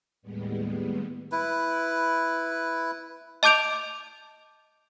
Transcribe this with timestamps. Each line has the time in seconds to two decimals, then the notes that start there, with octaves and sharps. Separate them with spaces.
0.22 D#2 A2 G3 G#3 B3
1.32 E4 B4
3.43 D#5 A5 D6 G6 D7 F7